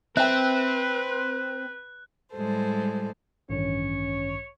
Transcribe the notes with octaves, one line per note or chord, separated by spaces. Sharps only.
C4 B4 E5 G5 F#6
A2 G3 G#3 A4 C5
A1 G2 D#3 C#4 C#5